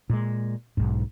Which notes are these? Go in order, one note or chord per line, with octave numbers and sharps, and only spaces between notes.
A#2 G#3
B1 G#2